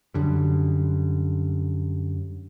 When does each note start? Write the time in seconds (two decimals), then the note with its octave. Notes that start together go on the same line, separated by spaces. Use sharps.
0.14 F#2 D3 G3